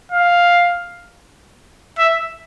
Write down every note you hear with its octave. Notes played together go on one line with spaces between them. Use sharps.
F5
E5